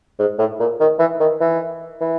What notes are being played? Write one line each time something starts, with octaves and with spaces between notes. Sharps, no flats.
G#2
A2
A#2
D#3
E3
D#3
E3
E3